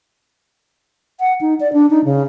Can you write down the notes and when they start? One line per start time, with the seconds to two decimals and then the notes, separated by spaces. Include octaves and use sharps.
1.20 F#5
1.41 D#4
1.60 D5
1.73 D4
1.90 D#4
2.05 C#3